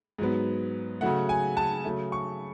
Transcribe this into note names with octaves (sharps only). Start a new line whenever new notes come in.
G#2 F#3 B3
C#3 F#3 A3 F#5
G#5
A5
C#3 F#3 A3
C#6